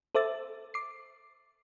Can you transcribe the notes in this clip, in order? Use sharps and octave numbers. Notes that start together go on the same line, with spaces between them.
A4 C5 E5 D6 E6 A6
D6 C7